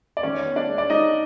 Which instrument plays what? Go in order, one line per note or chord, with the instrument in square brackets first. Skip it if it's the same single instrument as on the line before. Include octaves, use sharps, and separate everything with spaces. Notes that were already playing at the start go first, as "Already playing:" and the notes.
[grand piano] D5
D#3 C#4 C#5
B3
D4 D5
G#3
D5
G#3 D#4 D#5